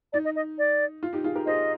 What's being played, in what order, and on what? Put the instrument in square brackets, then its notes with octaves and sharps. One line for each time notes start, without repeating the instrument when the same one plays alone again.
[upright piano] D#4 [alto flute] D5
[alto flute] D#5
D#5
D5
[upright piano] F4
D#4 G4
F4 G#4
G4 A#4
[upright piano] G#4 C5 [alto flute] D#5